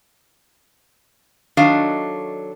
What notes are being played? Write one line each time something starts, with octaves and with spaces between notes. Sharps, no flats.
D#3 F#3 D4 A4 D#5 F5